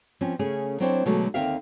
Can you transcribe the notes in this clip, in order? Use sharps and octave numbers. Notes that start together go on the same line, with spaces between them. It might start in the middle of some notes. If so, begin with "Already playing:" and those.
F3 C4 C#4
C#3 A3 C#4 G#4
F#3 C4 D4 E4 C5 C#5
B2 D3 F#3 G#3 A3
D#2 D3 C4 A#4 E5 F5